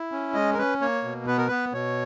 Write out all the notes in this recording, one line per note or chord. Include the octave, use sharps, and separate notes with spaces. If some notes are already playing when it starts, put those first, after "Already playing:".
Already playing: E4
C#4
G#3 D#5
A#4
C#4 B4
A#3 C#5
B2
B3 B4
A#4
B3 B4
B2 C#5